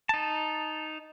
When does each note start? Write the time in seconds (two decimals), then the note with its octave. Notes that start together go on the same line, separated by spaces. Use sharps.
0.09 D#4 A5